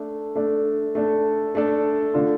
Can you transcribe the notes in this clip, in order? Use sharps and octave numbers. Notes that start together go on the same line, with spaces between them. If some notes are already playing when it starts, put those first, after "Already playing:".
Already playing: A3 D4 A4
A3 D4 A4
A3 D4 A4
A3 D4 A4
D3 A3 D4 F4